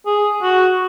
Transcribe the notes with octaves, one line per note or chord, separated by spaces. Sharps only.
G#4
F#4